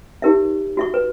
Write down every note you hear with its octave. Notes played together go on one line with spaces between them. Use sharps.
D#4 G4 A#4 C#5 E5
F#4 E5 C#6
B4